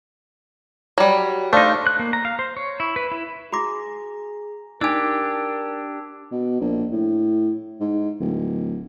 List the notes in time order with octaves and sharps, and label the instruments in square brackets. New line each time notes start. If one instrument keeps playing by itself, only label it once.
[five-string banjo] F#3 G3
[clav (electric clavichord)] A3 D#4 [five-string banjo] D4 [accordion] C5 F5
[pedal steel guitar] F#6
A#3
A#5
F5
C5
C#5
E4
B4
E4
[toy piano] F#4 D6 [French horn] G#4 [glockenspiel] A#5 A#6
[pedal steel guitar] D4 G4 [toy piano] D#4 G#5 [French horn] A#4 [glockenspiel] D6 E6 G#6
[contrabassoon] B2
A#1
A2
G#2
D1